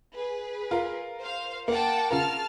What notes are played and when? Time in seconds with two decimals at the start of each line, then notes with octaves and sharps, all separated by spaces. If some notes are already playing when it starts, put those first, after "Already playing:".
0.14 G#4 B4
0.71 F4 A#4
1.21 C5 F5
1.68 A#3 F#5 G5 A5
2.11 C#3 F4 A#4 A5 F6